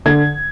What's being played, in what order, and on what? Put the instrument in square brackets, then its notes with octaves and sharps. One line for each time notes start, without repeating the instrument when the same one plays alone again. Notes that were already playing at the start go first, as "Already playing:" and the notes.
[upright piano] D3 G#6